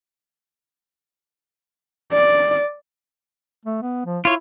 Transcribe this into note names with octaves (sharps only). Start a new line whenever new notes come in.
D5
A3
B3
F3
E4 F4 C#5